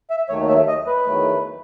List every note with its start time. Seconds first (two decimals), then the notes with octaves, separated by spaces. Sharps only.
0.10 E5
0.29 D#2 D#3 F#3 A3 C#5
0.48 E5
0.68 D#5
0.87 B4
1.06 E2 D#3 F#3 A3